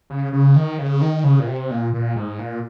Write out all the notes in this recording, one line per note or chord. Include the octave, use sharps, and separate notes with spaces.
C#3
C#3
D#3
C#3
D#3
C#3
A#2
C3
A#2
A#2
G#2
A#2